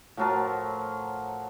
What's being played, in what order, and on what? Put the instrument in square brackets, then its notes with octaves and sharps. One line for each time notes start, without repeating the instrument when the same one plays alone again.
[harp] A2 A5 [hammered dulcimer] F3 F#3 A#4